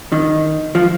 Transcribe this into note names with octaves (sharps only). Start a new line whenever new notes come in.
D#3
F3